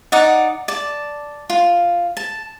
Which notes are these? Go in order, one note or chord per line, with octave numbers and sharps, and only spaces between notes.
D#4 D5 F#5
D5 A5
F4
A5